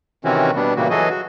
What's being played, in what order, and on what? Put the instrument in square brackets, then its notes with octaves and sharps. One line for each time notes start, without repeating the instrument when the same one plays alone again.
[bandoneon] C3 D#3 E3 C4 C#4 F#4
B2 G3 B3 D4
A#2 C#3 E3 G3 A#3 F#4
E3 F#3 F#4 G#4 A4 D#5
F#4